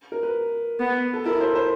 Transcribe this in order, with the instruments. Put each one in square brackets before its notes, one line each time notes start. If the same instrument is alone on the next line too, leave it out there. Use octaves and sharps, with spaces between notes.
[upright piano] A#4
B4
[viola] B3
[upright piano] A4
[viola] E4 [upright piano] A#4
[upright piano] C5
C5